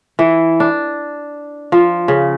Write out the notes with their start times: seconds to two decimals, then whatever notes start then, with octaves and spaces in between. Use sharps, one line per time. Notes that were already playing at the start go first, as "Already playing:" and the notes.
0.19 E3
0.60 D4
1.72 F3
2.08 C#3